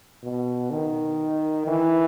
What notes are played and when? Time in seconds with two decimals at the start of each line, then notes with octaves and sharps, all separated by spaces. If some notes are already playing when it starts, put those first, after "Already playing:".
0.23 B2
0.71 D#3
1.67 E3